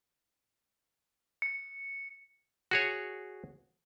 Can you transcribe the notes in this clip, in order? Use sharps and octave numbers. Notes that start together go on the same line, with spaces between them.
C#7
F#4 G#4 C#5